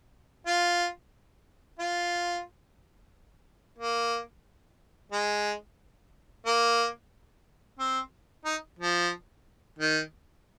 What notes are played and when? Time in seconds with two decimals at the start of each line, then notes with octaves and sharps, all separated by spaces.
0.46 F4
1.79 F4
3.79 A#3
5.12 G#3
6.46 A#3
7.79 C4
8.45 D#4
8.79 F3
9.79 D#3